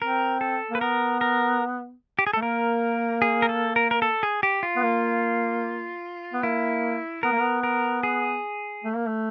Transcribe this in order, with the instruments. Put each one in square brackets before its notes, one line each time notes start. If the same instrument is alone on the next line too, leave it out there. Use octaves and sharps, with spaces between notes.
[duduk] C4 [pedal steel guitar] A#4
[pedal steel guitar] A4
[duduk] A#3 [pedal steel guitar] B4
[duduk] B3 [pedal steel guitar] A#4
[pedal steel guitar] A#4
G4
G#4
A4
[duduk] A3
[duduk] A#3 [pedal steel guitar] A#4
[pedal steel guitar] G#4
A#4
A4
A#4
A#4
A4
G#4
G4
F4
[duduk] B3
A#3
B3
[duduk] A#3 [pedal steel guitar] E4
[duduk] B3 [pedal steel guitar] A#4
[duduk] A#3
B3
[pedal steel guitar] A#4
G#4
[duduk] A3
A#3
A3